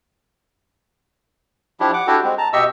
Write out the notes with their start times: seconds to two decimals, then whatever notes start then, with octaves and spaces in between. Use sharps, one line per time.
1.80 F3 D4 E4 G4
1.94 F#5 D6
2.07 D4 E4 F#4 G4 A4 G5
2.24 G#3 C4
2.38 A5 A#5
2.53 B2 G4 D#5 E5 C#6 E6